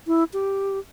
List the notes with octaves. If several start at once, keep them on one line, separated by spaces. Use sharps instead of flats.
E4
G4